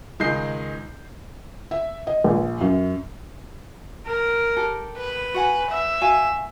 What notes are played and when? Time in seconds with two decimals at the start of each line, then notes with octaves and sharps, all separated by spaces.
0.20 C#2 D#3 G#3 D#5 G6 C7
1.71 E5
2.07 D#5
2.24 A#1
2.61 F#2
4.06 A#4
4.57 G4 A4
4.97 B4
5.34 F#4 F#5 G#5
5.70 E5
6.01 F#4 F5 G#5